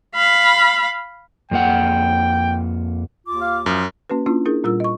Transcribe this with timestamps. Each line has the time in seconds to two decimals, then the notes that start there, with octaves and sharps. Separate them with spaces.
0.15 F5 B5
1.51 F2 A#3 F#5 G5
3.27 D#2 F4 D6
3.42 F5
3.66 F#2 F3
4.10 A#3 C#4 F#4 B4
4.26 A#3 C#4 D4 E4 F4
4.45 D4 E4 G#4 A#4
4.64 A#2 G3 F4 A#4 E6
4.80 D#5 C#6